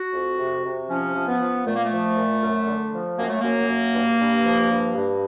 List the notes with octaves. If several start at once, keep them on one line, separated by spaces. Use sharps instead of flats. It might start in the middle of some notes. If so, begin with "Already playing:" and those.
Already playing: F#4
F2
C3
C3
F3 C#4
F3
B3
F3
A#2 A3
A#3
A3
F3
A#2
F#2
D3
F3
F#2 A#3
A3
F#2 A#3
F#2
G2
G2
F3
G2
G2